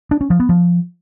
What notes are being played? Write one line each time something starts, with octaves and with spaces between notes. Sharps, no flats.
D4
C#4
F3
B3
F3